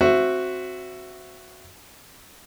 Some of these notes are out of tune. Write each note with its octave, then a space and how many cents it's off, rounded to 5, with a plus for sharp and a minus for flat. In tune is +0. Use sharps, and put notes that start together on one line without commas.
C4 +0 F#4 +0 E5 +15